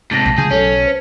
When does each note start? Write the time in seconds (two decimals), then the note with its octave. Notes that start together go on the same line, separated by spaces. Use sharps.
0.11 G#2 C3 A5 A6 A#6
0.26 A#1
0.38 C#3 F3 G#3 G#4 G6
0.51 B1 F#3 C#4 A4 C#5
0.85 B4 C5